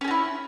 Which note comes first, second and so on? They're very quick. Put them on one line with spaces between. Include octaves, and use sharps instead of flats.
C#4 G#4 F#4 E4